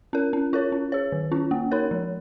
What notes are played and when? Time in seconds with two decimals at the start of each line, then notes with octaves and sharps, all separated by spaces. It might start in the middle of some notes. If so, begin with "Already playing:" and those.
0.13 C#4 A#4
0.33 C#4
0.53 F4 A#4 C#5
0.72 C#4
0.92 G#4 C#5
1.12 D#3
1.32 C#4 F4
1.51 A#3
1.71 D#4 A#4 C#5
1.91 F3